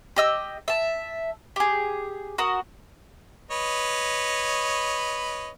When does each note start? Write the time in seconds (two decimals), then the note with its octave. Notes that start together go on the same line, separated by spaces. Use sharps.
0.16 G4 D#5 E6
0.68 E5 A5
1.56 G4 G#4
2.38 F#4 A#4 D#6
3.51 B4 C#5 D#5